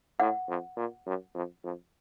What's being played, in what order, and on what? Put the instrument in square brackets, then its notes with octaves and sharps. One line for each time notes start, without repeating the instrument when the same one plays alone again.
[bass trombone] A2 [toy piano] F#5
[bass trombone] F2
A#2
F#2
F2
F2